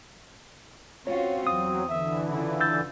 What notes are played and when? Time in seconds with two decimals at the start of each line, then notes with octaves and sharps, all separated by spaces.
1.07 C4 C#4 F4 F#4 C#5
1.47 E2 F#3 D#6
1.89 D3 E3 E5
2.30 C#3 E4 F4
2.60 E6 G6 A6